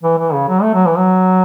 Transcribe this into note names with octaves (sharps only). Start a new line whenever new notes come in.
E3
E3
C#3
F#3
A3
F#3
E3
F#3